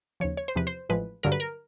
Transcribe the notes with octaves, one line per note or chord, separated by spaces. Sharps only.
D#2 C#3 F3 C#5
C#5
C5
E2 C3 F3 B4
C5
A1 A2 F3 G#3 B4
G2 D3 F#3 A#4
B4
A#4